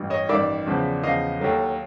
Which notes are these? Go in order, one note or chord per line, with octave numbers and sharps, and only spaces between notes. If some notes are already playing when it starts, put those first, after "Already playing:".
Already playing: A1 G2
C#5 D#5
A1 G2 D#3 D5 E5
E2 C#3 F3
E2 C#3 F3 D#5 F5
D#2 D3 F#3 A3